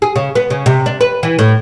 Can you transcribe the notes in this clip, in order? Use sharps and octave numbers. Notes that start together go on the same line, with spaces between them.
G#4
C#3
B3
C#3
C3
D4
B4
E3
A2